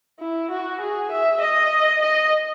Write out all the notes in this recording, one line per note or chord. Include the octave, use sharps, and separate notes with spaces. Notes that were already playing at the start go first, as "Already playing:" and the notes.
E4
F#4
G#4
E5
D#5
D#5